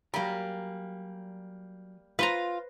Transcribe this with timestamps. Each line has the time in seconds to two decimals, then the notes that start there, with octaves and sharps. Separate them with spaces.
0.14 F#3 G3 A#3 G#5 A#5
2.19 F4 B4 C5 A#5